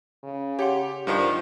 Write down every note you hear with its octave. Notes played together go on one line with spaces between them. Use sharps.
C#3
G4 C#5 F#5 C6
G2 D#3 F3 G3